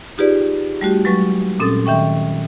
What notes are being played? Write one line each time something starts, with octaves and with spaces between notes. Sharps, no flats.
D#4 F4 G4 G#4 B4 D5
G3 A3 F#4 G4
F#3 G#3 B4 C#6 A6
A#2 C4 C#4 A4 D#6 A6
D#3 E5 G5 C#6